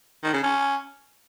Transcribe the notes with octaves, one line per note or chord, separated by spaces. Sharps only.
D#3
C#3
C#4